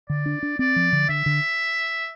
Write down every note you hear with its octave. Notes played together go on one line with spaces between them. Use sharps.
D3 D5
D4
D4
C4 D5
F3
D3
D3 E5
D3